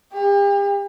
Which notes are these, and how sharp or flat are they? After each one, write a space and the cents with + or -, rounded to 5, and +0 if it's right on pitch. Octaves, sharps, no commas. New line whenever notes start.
G4 +40